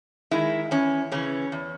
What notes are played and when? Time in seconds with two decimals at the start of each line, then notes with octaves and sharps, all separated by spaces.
0.31 D#3 G#3 E4
0.71 E2 C#4
1.12 C#3 E3 C#4
1.52 E2